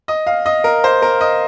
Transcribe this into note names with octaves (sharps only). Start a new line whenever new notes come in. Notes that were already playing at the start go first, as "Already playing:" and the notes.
D#5
F5
D#5
A#4
C5
A#4
D#5